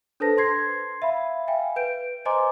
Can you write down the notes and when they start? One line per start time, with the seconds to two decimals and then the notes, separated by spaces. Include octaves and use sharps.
0.20 D4 A4 B4 C5 A5 A#6
0.38 C6 G#6 C7
1.02 E5 F5 B5
1.48 E5 F5 G5 G#5
1.76 B4 G6 D7
2.25 C5 D#5 G#5 A#5 C6 D6